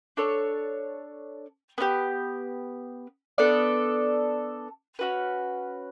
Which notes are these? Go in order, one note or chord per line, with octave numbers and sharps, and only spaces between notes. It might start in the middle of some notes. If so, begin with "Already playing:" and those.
D4 A4 C#5
B3 D4 G4
B3 D4 A4 D5
C#4 F#4 B4